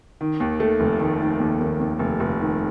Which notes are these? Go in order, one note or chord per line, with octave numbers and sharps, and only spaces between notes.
D#3
D#2
A3
F1
D#3
D#3
D#2
D#2
D#2
F1
F1
D#3